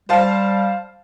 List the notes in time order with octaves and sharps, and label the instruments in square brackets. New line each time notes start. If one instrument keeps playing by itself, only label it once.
[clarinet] G3 [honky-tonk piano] C5 F5 A5